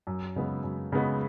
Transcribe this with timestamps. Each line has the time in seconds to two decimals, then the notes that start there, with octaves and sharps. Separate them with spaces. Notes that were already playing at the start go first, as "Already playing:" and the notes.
0.07 F#2
0.36 C#3 G#3 B3
0.64 F#2
0.92 C#3 G#3 B3